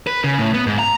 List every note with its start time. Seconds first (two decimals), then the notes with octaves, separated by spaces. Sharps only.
0.07 B4
0.24 C#3
0.39 A2
0.54 B3
0.67 G#2
0.79 A#5